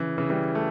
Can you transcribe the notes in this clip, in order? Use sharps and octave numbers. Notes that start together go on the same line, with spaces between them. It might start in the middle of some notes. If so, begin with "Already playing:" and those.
Already playing: C#3 E3
C#3 E3
E3 G3
A3